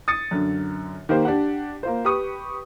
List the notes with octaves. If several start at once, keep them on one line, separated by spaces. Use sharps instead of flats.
D#6 A6 C#7
F#2 D3
D#3 A#3 G4 C5
D4 G4 F#5
A#3 F4 C5
G4 B4 C#6 D#6